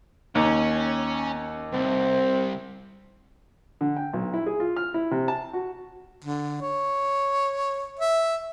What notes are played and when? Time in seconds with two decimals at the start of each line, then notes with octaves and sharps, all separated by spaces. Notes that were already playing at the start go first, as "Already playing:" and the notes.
0.35 D#2 C#4
1.73 C2 C4
3.81 D3
3.96 G5
4.13 B1
4.34 E4
4.46 G#4
4.60 F4
4.77 F6
4.94 E4
5.11 C3
5.28 A5
5.53 F#4
6.25 D3
6.62 C#5
8.00 E5